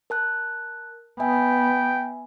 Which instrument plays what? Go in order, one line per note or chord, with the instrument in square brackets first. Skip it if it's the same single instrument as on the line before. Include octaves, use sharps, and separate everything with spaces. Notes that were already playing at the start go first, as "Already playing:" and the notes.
[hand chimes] A#4 A5 F#6
[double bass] B3 [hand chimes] E5 G#5 [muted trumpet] G5